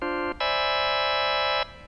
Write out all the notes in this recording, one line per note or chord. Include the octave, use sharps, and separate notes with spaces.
D4 F4 C5
C5 D5 E5 G#5 B5 E6